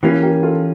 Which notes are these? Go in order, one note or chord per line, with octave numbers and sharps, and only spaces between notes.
E3 A#3 C#4 E4 G4
G4 A#4
F4 A4